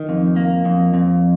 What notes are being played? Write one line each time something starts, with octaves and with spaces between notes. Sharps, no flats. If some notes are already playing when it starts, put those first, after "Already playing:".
Already playing: D#3
F2
A#3
F2
F2